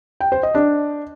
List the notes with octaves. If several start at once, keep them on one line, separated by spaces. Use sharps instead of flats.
G5
C5
D#5
D4